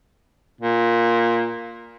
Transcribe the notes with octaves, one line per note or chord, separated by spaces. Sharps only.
A#2